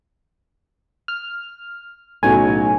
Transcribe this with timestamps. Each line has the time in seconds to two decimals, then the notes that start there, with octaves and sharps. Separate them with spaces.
1.08 F6
2.23 B1 A2 C#3 F#3 G#5